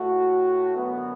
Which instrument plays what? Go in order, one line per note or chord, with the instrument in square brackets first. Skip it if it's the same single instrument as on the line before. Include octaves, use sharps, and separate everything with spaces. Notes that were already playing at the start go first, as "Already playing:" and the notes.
Already playing: [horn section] A2 A3 F#4
F#2 D3 B3